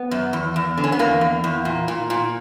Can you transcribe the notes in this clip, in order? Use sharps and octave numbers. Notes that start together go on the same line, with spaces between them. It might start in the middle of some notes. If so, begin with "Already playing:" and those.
Already playing: B3
F#2
E2
E2
D3
C#4
B3
E2 A#3
E2
E2
A#2
A#2
A#2